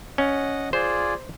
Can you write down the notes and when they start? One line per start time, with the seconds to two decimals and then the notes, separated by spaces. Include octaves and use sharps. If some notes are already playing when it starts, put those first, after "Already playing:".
0.18 C#4 D#5 F#5
0.73 F4 G#4 C5 D5